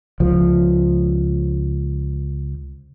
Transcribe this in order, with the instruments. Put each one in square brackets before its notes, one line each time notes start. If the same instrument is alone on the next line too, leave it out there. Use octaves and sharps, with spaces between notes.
[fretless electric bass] C#2 F3